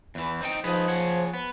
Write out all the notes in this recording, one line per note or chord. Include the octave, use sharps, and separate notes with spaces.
E2 E3
C4 D#4 G5
F3 D#4 G#4 B4
G#4 C#5 F#5
B3